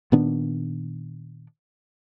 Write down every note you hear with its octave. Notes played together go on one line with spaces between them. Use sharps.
A#2 D#3 B3 D4